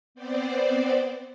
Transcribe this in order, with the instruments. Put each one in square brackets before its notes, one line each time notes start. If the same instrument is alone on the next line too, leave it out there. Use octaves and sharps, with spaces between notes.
[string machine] B3 C4 C5 D5